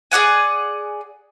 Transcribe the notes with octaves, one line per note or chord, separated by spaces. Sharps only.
G#4 D5 F#5 G#5